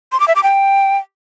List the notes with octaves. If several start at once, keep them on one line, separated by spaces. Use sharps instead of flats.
C6
D6
E5
D6
G5